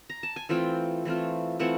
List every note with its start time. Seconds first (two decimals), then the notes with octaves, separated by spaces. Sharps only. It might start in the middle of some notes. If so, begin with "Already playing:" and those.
0.10 A#5
0.23 A5
0.36 G#5
0.49 E3 A3 C4 F4 G5
1.05 E3 A3 C4 F4
1.59 E3 A3 C4 F4 F#5